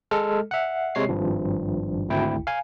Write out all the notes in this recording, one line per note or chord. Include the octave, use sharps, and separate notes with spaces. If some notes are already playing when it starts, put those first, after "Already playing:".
G#3 A4 F6
E5 F#5
C3 G#3 C#5 C7
G#1 G2 F3
G#1 D2 E4 G5
F5 G#5